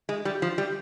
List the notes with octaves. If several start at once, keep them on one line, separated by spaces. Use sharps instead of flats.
G#3
G3
F3
G3